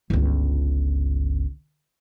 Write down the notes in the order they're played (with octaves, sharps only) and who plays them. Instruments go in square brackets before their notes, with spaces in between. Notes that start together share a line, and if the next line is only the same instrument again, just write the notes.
[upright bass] G1 C#2